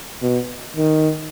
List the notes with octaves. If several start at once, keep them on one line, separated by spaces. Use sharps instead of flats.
B2
D#3